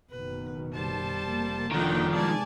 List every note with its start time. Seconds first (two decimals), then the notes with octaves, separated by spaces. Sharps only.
0.10 F#1 B2 D#3 B4
0.75 G3 C5 A5
1.22 F1 A#3
1.72 D3 D#3 F3 D4 D#4 F#5 G5
2.12 C3 G#3 B3 D5 G#5 A5